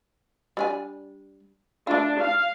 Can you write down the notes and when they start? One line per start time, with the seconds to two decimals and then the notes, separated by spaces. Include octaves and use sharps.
0.57 G3 D4 G#5
1.87 A3 D4 F4
2.20 F5